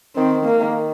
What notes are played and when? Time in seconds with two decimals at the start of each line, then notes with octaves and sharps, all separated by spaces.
0.15 D#3 C4
0.45 A#3
0.60 D#3